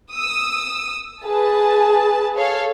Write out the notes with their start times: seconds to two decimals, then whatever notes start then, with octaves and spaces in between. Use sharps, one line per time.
0.11 D#6 E6
1.25 G#4 B4 A5
2.36 A4 C#5 F5